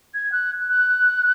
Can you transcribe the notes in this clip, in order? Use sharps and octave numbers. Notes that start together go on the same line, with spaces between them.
G#6
F#6
F#6